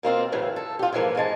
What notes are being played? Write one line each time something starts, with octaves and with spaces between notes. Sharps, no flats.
B2 A#3 C4 F4
F#2 A2 C#3 E3
A4
F4 G4
G#2 C#3 E3 F3 A#3
G#2 G#3 A5